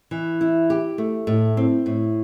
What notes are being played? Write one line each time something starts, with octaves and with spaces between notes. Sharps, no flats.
E3
E4
G4
A3
A2
C4
A2